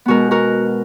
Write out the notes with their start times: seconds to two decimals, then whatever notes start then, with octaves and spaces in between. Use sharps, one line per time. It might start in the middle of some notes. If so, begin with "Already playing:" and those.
0.06 B2 G#3 B3 F#4 A#4
0.31 F#4 A#4